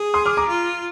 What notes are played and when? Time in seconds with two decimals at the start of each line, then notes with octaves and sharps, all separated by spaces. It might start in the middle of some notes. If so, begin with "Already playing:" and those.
Already playing: G#4
0.14 C6 D#6
0.26 D6 F6
0.37 A#5 D6
0.48 F4